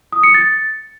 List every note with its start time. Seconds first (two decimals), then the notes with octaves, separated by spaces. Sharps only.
0.13 D#6
0.23 C#7
0.34 A6